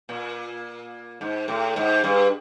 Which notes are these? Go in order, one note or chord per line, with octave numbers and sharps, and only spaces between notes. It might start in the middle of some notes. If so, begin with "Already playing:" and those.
A#2
G#2
A2
G#2
G2